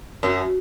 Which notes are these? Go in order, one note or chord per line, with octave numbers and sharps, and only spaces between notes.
F#2